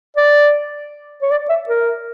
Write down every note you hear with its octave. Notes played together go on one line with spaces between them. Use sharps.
D5
C#5
D5
E5
A#4